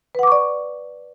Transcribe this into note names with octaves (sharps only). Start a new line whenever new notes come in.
B4 D5 F#5 C#6 D6